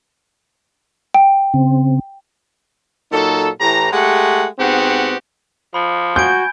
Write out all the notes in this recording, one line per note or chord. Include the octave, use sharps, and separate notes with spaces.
G5
C#3 C4
A#2 F#3 D#4 A4
A2 E3 G4 A#5
G#3 A3 G4 F#5
G#2 B3 C4 F#4 G4 F#5
F3 B5
F#4 G#5 G6 G#6 D7